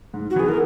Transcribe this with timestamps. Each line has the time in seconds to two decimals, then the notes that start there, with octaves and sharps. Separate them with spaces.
0.14 G#2
0.30 F#4
0.36 E3 B3 G#4
0.49 A#4